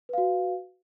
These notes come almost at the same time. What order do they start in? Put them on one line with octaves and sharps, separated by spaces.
B4 F5 F#4